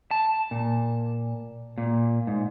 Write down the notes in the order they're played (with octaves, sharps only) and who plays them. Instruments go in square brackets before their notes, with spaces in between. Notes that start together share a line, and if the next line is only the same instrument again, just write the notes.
[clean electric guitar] A5
A#2
A#2
G#2